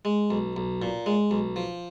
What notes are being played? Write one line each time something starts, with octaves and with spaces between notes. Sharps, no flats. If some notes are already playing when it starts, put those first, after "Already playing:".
G#3
B1
B1
A#2
G#3
B1
F3